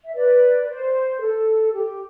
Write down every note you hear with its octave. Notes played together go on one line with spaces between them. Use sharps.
E5
B4 D5
B4
C5
A4
G4